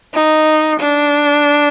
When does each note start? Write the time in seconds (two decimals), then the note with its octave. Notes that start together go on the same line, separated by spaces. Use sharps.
0.13 D#4
0.80 D4